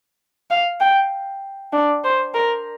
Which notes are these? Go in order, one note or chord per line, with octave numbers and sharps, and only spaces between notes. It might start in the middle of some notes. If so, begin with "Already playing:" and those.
F5
G5
D4
C5
A#4